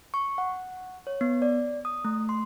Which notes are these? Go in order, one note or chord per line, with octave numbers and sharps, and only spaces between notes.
C#6
F#5
C#5
B3
D5
D#6
A3
C6